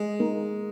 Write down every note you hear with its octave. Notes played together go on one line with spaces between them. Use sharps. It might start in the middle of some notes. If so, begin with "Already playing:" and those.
Already playing: G#3
A#3 D#4 A#4